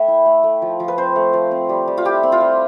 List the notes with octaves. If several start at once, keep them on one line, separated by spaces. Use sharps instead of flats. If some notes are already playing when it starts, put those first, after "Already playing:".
Already playing: A3 E5 G5 A5 B5
E4
A3
A3
F3
F3
B4
C4 C5
A3
F3
C4
G3
G3
F4
E4 G4
C4
F4
G3